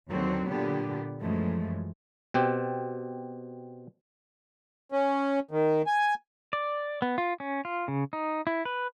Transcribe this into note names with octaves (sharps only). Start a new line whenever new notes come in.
D#2 D3 F#3 C4 F#4
A#2 D3 B3 G4
F#2 E3 F3 G#3 A3
B2 C4 G4
C#4
D#3
G#5
D5
B3
F4
C#4
F4
C#3
D#4
E4
B4